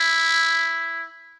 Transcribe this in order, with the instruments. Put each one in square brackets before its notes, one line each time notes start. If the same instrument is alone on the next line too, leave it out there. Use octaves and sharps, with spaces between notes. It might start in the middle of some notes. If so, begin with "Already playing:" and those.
Already playing: [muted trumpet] E4